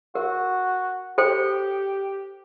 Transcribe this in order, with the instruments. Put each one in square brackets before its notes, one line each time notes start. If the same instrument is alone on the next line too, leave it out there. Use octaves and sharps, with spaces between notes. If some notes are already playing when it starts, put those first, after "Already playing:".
[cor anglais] F#4 [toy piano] A#4
[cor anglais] G4 [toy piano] A4 C5 G5